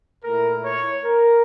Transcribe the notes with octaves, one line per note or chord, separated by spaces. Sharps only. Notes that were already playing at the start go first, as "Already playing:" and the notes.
A#2 A3 E4 A#4
C#5
A#4